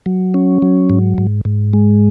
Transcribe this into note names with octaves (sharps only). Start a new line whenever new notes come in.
F#3
C#4
F#3
G#2
G#2
G#2
G#3